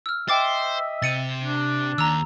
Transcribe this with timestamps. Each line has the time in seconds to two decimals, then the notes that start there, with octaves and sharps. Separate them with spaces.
0.06 E6 F6
0.29 C5 D#5 E5 G5 D6 A6
1.02 C3 A6 C#7 D#7
1.43 D4
1.98 D#2 A#5 E6